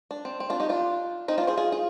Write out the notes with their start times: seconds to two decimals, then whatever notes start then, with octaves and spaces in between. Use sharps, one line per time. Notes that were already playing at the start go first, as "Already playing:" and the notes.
0.11 D4
0.25 C4
0.40 C4
0.50 D4 F4
0.60 D#4 G4
0.69 D4 F4
1.28 C4 D#4
1.38 D4 F4
1.47 G#4 C5
1.57 F4 G#4
1.72 F4 G#4